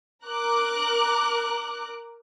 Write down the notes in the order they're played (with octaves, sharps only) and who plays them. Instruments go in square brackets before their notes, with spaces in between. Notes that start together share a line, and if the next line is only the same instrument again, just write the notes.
[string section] A#4 A#5 D6 F#6